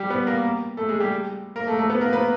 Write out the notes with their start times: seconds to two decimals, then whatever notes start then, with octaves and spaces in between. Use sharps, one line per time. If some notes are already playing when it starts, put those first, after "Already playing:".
Already playing: G3 G4
0.10 B3 B4
0.26 A#3 A#4
0.77 A3 A4
0.89 G#3 G#4
1.00 G3 G4
1.56 A#3 A#4
1.67 A3 A4
1.79 A3 A4
1.90 B3 B4
2.01 A#3 A#4
2.13 B3 B4